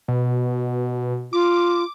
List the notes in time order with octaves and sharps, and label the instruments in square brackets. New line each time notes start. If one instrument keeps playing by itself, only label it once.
[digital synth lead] B2
[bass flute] F4 [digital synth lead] D6